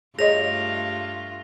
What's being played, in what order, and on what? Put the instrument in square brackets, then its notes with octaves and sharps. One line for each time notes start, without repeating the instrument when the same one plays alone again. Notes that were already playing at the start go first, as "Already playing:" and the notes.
[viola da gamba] G2 A3 F4 [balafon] G#4 C#5 D#5 [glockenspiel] A#6 F7